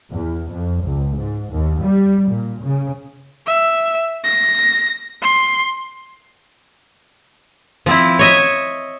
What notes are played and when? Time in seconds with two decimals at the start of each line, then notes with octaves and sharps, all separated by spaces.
0.11 E2
0.51 F2
0.84 C#2
1.16 G#2
1.53 D#2
1.83 G3
2.31 A#2
2.63 C#3
3.47 E5
4.25 A#6
5.22 C6
7.86 F3 C4 E4
8.19 C#5 D#5 E5